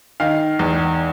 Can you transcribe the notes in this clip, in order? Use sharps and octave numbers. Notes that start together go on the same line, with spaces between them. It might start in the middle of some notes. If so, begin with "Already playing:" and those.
D#3 F5
E2